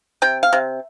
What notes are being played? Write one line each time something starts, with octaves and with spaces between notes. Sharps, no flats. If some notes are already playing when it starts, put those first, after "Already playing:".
C3 G5
F5
C3